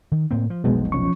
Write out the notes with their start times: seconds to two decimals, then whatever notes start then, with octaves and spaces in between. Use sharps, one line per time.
0.12 D#3
0.31 A2 A#3 C4
0.50 F3
0.64 F1 B1 F2 B2 G#3
0.92 F3 C#4 C#6